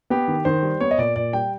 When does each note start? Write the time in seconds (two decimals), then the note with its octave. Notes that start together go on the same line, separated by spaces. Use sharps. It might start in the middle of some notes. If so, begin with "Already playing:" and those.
0.10 B3 G4
0.28 D#3
0.45 D#3 C5
0.63 G3
0.80 B3 C#5
0.91 D#5
0.98 A#2 D5
1.16 A#2 D5
1.33 G3 G5